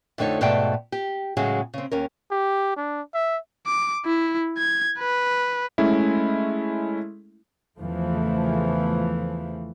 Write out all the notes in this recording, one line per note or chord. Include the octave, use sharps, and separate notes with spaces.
F2 D3 A3 D#4 C#5
G#2 B2 A3 D5 G5 A5
G4
A2 C#3 F#3 G#3 G#4
C#3 C4
D#2 C#4 A#4
G4
D4
E5
D6
E4
G#6
B4
G#3 A3 C#4 E4
E2 C#3 E3 F3 A3